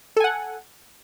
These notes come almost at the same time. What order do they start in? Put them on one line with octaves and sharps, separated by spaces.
A4 G#5 F#5